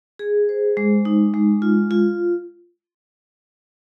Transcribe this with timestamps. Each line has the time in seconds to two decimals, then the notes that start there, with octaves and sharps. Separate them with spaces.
0.19 G#4
0.49 C5
0.77 G#3
1.05 D#4
1.34 G#3
1.62 F4
1.91 F4